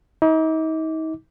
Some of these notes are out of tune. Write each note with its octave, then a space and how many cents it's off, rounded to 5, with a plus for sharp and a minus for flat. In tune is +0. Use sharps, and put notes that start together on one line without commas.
D#4 +40 D6 -15